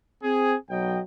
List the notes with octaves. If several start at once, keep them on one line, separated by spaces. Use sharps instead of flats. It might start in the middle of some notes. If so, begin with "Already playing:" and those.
C4 G#4
B1 F#3 D#5 G5